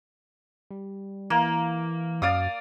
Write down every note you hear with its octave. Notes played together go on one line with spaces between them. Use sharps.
G3
E3 A#3
F#2 D5 F5 D#6